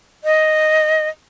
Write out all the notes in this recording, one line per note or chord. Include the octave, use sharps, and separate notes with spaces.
D#5